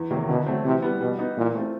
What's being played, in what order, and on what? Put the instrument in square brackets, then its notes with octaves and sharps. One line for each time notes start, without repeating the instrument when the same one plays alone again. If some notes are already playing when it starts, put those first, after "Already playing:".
Already playing: [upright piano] E2
C3 D#3 F#3 A#3
[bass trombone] B2 [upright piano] D3
[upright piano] F#3 A3 C4
[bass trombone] C3 [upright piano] E3
[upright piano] G3 B3
[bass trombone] B2 [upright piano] G3
[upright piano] B3 D#4
[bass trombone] A#2 [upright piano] E3
[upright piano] A3 C4 F4